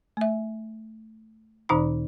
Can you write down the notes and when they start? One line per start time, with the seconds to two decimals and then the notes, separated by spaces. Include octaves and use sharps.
0.17 A3 E5
1.69 D2 A#2 D#3 D#4 C5 B5